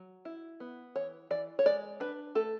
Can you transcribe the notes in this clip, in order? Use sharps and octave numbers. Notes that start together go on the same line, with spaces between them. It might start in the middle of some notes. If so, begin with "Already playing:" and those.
Already playing: F#3
E4
B3
E3 C#5
E3 D5
C#5
G#3 D5
D4 B4
A3 A4